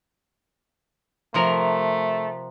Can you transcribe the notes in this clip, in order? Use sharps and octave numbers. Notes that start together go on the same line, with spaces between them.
C3 F3 A3 A#4 C5 A#5 C6